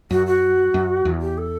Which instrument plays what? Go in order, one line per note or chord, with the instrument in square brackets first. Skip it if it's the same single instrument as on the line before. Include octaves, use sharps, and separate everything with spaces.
[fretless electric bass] F#2 [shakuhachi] F#4
[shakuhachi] F#4
[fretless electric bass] F#2
E2
[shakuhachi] G4
A4